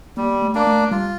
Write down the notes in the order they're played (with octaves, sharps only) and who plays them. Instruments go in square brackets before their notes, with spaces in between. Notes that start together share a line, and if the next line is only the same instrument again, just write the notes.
[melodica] G3 [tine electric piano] A#3
[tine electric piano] A3
[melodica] A#3 D4
[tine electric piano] A3
[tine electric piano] G3 [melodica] F4